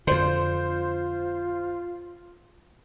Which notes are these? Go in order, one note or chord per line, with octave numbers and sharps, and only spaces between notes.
F2 D3 F4 C5